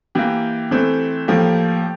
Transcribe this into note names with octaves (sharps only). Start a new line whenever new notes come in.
E3 A#3 G4
E3 A3 C4
A2 F3 A#3 G4